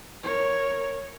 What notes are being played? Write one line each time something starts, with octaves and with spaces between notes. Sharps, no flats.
A#4 C#5